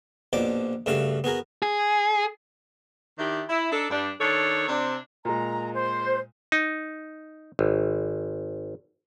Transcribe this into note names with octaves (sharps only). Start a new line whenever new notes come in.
A#1 B2 F3 D5 D6
G2 C#3 A3 F#4 F5
B3 F#4 G#4 A#4
G#4
D#3 D4 E4 G4
E4
D4 D#4 A4
G2 G3 D4
D#3 D4 A4 C#5
C3 C4 D4
A#2 G#3 A#5
C5
D#4
G#1